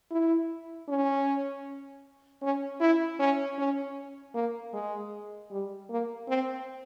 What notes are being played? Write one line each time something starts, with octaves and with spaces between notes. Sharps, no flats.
E4
C#4
C#4
E4
C#4
C#4
A#3
G#3
G3
A#3
C4